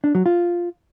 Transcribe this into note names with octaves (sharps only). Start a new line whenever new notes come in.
D4
F#3
F4